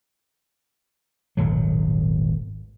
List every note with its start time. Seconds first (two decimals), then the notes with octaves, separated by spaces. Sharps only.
1.37 D#1 G#1 B2 F#3